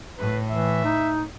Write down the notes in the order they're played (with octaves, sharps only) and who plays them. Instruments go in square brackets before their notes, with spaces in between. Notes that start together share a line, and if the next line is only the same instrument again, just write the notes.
[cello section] A2 [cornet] B4
[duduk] E3 [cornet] E5
[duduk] D#4